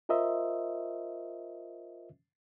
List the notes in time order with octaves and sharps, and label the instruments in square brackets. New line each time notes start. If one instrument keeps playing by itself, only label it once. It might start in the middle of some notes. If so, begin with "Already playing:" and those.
[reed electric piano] F4 A#4 C5 D#5 E5